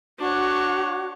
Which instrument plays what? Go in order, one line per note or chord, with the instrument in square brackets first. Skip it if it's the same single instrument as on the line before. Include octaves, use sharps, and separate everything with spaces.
[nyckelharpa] D4 C#5 [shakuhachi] F#4